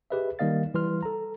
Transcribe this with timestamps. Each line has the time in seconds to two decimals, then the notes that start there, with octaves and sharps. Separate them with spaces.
0.10 G4 G#4 B4 D#5 E5
0.39 D#3 G3 A#3 D#5 F5 A6
0.74 E3 G3 B4 C6 F6
1.03 A4 A#5